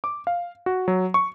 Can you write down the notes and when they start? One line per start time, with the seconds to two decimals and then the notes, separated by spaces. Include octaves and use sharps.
0.04 D6
0.27 F5
0.66 F#4
0.88 F#3
1.14 C#6